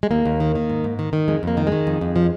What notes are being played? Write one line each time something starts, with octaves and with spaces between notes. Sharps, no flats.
G#3
D#2 A#3
D#2
D#3
D#3
G#2
G#2
D#3
D#3
F2 G#3
F2 A#3
D#3
G#3
D#3
F2
F2
F3